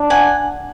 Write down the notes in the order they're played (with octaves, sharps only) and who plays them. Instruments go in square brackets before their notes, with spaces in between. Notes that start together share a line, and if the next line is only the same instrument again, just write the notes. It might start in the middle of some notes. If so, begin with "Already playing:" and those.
Already playing: [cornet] D4
[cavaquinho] F#5 G#5